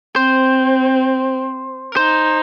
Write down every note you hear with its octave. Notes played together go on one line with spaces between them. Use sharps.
C4 C5
A#4
D#4 C5